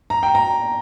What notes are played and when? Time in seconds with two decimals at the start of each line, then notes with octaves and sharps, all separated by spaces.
0.10 A#5
0.23 G5
0.35 A#5